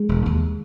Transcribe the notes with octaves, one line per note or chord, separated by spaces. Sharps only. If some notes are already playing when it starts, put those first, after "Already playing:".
Already playing: G#3
E1
D#2